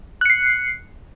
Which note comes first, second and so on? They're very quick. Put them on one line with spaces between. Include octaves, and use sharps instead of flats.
F#6 C#7 C7